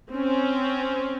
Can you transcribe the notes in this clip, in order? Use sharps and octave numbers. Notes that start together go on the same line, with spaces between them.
C4 C#4